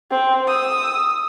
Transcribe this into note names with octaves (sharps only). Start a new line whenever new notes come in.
C4
D#6 E6